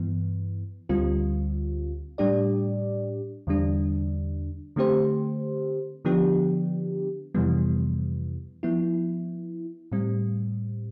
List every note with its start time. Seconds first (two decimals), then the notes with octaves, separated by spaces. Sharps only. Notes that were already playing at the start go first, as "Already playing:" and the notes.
Already playing: G2 E3 B3
0.89 D2 D3 G3 C4 F4
2.18 A2 G3 D4 G4 D5
3.47 E2 D3 G3 D4
4.76 D3 A3 C4 G4 C5
6.05 D3 F3 B3 D4 G4
7.34 F2 C3 E3 G3 B3
8.63 F3 B3 E4
9.92 A2 G3 C4